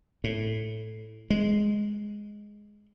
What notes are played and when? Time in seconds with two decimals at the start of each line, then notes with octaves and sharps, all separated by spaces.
0.24 A2
1.30 G#3